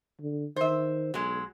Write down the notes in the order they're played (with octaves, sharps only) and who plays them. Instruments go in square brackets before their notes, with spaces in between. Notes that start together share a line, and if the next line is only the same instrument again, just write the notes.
[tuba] D3
[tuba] D#3 [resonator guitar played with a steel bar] C5 E5
[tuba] B1 [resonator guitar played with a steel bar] F#3 G#3